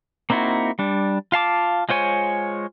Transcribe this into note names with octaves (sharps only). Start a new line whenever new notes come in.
A#3 C4 D#4 E4 F#4
G3 D4
F4 F5 A5 D6
G#3 F4 C5 C#5 G#5